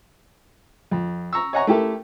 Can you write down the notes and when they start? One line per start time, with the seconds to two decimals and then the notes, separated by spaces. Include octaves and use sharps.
0.91 F2
1.33 A#5 C#6 E6
1.53 C#5 D#5 F#5 G#5 A#5 C#6
1.67 A3 E4 G4 A4 A#4